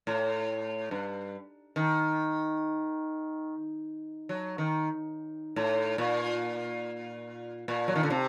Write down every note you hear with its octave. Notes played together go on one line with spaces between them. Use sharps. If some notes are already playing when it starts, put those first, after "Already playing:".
A2
G2
D#3
F#3
D#3
A2
A#2
A#2
F#3
D#3
D3
C3